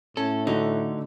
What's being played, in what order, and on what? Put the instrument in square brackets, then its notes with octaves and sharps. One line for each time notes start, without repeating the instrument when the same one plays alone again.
[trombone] A2 [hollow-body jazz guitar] C#4 [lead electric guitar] A4
[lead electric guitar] D3 [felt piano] A3 F#4 [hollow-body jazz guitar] D#4